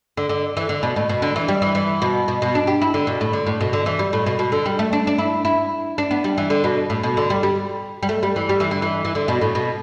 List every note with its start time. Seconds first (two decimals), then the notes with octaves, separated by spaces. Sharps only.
0.17 D3
0.29 D3
0.57 E3
0.69 D3
0.83 B2
0.96 A2
1.09 B2
1.22 D3
1.36 E3
1.48 G3
1.62 E3
1.75 E3
2.02 B2
2.28 B2
2.42 B2
2.55 D4
2.67 G4
2.81 E4
2.94 D3
3.07 B2
3.21 A2
3.33 D3
3.46 A2
3.61 B2
3.73 D3
3.86 E3
3.99 G3
4.13 A2
4.26 B2
4.39 B2
4.52 D3
4.66 G3
4.79 A3
4.93 D4
5.07 D4
5.18 E4
5.45 E4
5.98 D4
6.11 B3
6.24 G3
6.38 E3
6.50 D3
6.64 B2
6.90 A2
7.03 B2
7.17 D3
7.30 G3
7.43 G3
8.03 G3
8.09 A3
8.23 G3
8.36 E3
8.49 G3
8.60 E3
8.71 D3
8.82 E3
9.05 E3
9.15 D3
9.28 B2
9.41 A2
9.55 B2